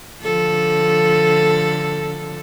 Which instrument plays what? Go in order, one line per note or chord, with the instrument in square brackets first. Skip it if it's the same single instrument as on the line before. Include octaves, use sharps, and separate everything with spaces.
[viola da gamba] D3 F3 A4